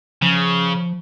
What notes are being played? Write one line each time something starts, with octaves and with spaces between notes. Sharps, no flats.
C#3 F3